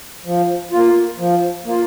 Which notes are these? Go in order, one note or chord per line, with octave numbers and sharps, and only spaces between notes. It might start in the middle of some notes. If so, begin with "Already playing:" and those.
F3
A#3 F4
F3
A#3 F4